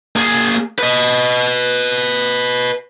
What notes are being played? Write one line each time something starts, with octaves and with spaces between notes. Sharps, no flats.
A#3 G#4
B4 D#5